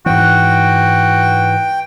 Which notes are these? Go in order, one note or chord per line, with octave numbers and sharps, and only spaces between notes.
G#2 E3 F#4 G5